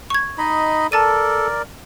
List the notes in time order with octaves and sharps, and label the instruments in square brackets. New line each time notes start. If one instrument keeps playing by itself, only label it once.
[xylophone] C#6 G#6
[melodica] D#4 D#5 B5
[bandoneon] A4 [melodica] A#4 D5 [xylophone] A5 A6 D#7